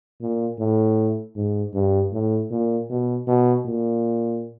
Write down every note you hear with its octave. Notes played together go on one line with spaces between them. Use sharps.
A#2
A2
G#2
G2
A2
A#2
B2
B2
A#2